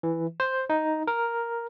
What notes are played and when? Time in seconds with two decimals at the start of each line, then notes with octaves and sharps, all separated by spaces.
0.03 E3
0.40 C5
0.70 D#4
1.07 A#4